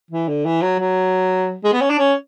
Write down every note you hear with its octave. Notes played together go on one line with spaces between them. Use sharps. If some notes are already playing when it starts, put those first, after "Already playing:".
E3
D3
E3
F#3
F#3
G#3
B3
C#4
D4
C#4